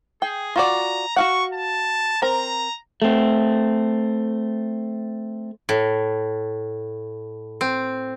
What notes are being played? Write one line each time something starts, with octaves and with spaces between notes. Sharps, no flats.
G#4 G5
F4 F#4 D5 A#5
F#4 F5 F#5 C#6
A5
C4 A#4 A#5
A3 C4
A2
C4